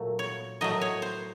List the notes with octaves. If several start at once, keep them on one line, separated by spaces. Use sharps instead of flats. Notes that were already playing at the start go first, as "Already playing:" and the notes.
Already playing: A#2 F#3 A3
C#5
A2 F#3 A3 D#5
C#5
C5